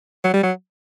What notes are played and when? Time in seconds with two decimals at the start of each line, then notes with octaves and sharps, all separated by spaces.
0.24 F#3
0.34 G3
0.43 F#3